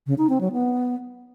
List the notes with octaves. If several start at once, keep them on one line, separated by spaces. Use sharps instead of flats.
C#3
D#4
C4
F#3
B3